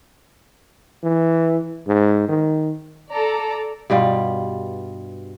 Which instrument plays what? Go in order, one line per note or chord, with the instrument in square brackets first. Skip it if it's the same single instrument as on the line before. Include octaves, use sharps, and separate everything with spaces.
[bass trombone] E3
G#2
D#3
[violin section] A4 D5 A#5
[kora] G2 B2 G3 F4